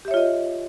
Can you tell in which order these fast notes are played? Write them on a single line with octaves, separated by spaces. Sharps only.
G4 E5 C#5 F4 D#5